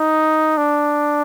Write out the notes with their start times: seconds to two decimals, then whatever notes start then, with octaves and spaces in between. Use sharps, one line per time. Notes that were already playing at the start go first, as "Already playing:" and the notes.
Already playing: D#4
0.57 D4